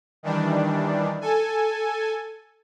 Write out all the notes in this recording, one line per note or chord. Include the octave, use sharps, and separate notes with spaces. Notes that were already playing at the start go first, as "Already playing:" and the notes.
D#3 E3 G3 D4
A4 G#5